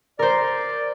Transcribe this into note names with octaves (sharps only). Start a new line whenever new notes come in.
A#4 C5 D5